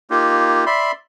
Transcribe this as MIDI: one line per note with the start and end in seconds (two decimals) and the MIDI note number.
0.11 0.64 58
0.11 0.64 63
0.11 0.64 65
0.11 0.64 67
0.66 0.92 74
0.66 0.92 76
0.66 0.92 83
0.66 0.92 84